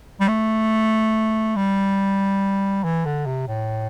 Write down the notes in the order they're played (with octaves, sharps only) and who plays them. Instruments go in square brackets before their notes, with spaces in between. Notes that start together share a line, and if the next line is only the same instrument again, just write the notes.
[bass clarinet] G3
A3
G3
E3
D3
C3
A2